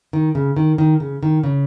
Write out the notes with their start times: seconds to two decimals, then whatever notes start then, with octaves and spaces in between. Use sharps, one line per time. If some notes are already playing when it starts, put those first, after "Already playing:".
0.13 D#3
0.35 C#3
0.57 D#3
0.78 D#3
1.00 C#3
1.23 D#3
1.44 C#3